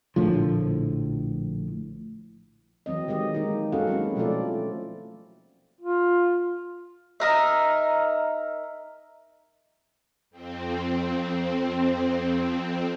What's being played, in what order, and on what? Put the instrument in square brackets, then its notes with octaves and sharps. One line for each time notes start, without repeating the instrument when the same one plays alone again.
[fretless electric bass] A#1 A2 D3 F3
[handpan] E3 F#3 C4 D#5
D#3 G#3 G4 D#5
G#3 A#3 D#4
A#3 C#4 F#4 A4 F5 F#5
F#3 G#3 A#3 C4 C#4 E4
B2 F3 A3 F4 A4 D5
[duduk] F4
[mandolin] D#4 A#4 E5
[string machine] F2 C4